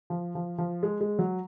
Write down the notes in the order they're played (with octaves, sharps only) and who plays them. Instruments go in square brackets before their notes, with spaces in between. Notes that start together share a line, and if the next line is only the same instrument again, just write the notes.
[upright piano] F3
F3
F3
G#3
G#3
F#3